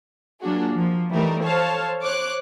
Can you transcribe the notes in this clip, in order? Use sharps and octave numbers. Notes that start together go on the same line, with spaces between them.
F#3 A#3 D4 F4 F#4 G#4
F3 A#3
E3 G3 A3 D#4 A#4
A4 C5 C#5 F5 A5
C5 C#5 D6 F#6